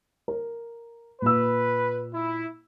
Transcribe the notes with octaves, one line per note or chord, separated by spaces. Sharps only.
A#4
A#2 B4 E6
E4